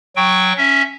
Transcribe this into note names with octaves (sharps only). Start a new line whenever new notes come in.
F#3 G5 C#6
C#4 E5